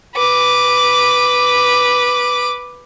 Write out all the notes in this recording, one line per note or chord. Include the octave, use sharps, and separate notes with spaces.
B4 D6